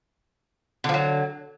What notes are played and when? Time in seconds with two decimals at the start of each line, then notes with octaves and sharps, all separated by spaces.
0.84 D3
0.89 F3
0.94 F#3